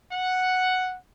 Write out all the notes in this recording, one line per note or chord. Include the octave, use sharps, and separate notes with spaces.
F#5